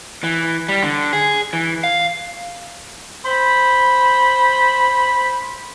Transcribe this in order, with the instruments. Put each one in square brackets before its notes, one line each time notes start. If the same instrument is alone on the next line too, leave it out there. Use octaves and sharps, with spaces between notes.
[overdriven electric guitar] E3
G3
D3
G#4
E3
F5
[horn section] C5 B5